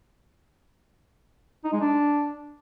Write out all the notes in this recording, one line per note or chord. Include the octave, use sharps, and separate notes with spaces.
D#4
G#3
D4